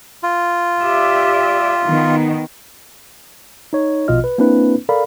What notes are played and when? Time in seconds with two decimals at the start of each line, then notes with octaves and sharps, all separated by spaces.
0.23 F4
0.81 G4 D5 E5
1.85 D#3 B3
3.73 D#4 C#5
4.08 A#1 B2 F4 D#5 F6
4.24 B4
4.38 A#3 C4 D4 E4 B4
4.89 A4 A#4 D5 F5 B5